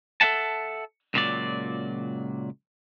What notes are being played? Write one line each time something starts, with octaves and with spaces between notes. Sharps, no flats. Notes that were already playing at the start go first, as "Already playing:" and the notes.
A4 B4 E5 F#5 A5
C#2 A#2 F#3 D5